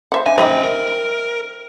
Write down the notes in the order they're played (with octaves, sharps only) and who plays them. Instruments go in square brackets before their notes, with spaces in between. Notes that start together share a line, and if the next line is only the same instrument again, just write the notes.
[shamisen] C5 E5 F#5
[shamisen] D4 [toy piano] E5 [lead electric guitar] G#5
[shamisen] G3 D#4 D#5 [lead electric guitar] C#4 G5 [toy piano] C5
[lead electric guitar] A#4